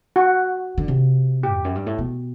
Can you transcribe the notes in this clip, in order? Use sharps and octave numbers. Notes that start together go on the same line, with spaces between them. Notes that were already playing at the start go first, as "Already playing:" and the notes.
F#4
D3
C3
G4
E2
F#2
G2
A2
B2